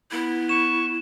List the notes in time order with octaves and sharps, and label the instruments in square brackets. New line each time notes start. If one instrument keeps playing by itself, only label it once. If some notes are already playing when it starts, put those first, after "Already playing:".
[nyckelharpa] B3 [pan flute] E4
[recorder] C#6 [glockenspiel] E7